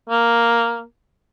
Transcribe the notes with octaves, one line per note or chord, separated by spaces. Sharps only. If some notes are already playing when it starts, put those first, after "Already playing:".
A#3